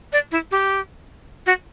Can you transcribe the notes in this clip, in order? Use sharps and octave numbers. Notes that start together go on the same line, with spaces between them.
D5
E4
G4
F#4